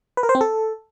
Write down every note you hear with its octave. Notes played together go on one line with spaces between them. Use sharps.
B4
A#4
C5
C4
A4